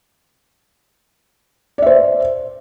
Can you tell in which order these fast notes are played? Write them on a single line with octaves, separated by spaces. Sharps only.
D5 E5 C5